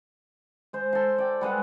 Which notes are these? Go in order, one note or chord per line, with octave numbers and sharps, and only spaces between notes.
G#3 C5
A4 C6
D5 G5
G3 G#3 B4 F#5